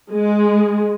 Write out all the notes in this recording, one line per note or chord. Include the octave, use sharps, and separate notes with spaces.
G#3